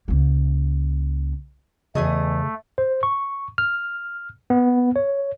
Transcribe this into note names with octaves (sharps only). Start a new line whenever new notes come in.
C#2 A#3
E2 C#3 A3 G#4 D#5
C5
C#6
F6
B3
C#5